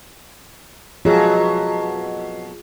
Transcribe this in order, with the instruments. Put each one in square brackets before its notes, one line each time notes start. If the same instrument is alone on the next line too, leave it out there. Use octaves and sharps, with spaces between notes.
[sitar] F2 B2 F#3 [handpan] F4 G#4